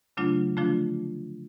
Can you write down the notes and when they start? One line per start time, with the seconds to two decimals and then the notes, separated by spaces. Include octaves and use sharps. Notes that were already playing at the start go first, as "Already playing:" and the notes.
0.17 C#3 F#3 A3 D4 F4
0.57 D3 F3 A3 D4 F4